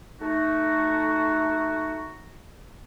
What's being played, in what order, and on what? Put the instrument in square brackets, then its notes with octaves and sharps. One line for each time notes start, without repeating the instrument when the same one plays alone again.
[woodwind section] A3 D#4 F#4